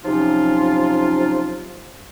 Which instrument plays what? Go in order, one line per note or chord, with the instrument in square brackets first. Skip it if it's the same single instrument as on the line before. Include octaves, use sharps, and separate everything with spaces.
[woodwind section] C3 F3 F#3 C#4 D#4 F4